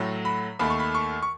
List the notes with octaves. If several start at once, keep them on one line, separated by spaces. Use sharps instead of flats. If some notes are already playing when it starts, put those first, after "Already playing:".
Already playing: A2 F#3 A3
B5
D#2 D#3 A3 B5
C#6
B5
C#6
C#6